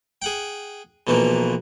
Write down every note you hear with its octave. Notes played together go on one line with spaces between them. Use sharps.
G#4 F#5 G5
B1 B2 E3 F3 A#3